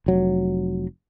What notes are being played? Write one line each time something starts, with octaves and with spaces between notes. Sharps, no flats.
F1 F#3